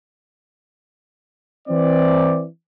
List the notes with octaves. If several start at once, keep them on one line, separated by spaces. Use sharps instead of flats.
E3 C4 D5